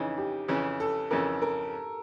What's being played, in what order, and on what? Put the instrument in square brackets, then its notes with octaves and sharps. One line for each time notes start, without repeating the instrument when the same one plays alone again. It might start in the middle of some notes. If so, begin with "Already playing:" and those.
Already playing: [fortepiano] F2 C#3 E3 [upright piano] D#4
[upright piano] G4
[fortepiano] F2 C#3 E3
[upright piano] A4
[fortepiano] F2 C#3 E3 [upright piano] A#4
[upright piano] A#4